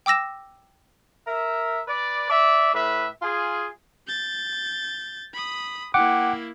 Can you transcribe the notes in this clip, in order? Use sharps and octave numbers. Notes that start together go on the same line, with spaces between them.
G5 D6 E6 A#6 E7
A#4 E5
B4 D5
D5 E5
A2 B4 E5
F4 G#4
G6 A6
B5 D#6
A#3 E4 F#5 G5 D6